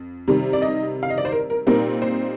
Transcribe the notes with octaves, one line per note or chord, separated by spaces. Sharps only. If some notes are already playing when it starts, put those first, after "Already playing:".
Already playing: F2
C3 D#3 G3
D5
D#5
F5
D#5
D5
C5
A#4
A#4
A#2 G3 C4 D#4 A#4
C5